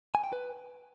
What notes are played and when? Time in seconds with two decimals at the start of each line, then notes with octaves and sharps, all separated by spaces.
0.15 G#5
0.24 G5
0.33 B4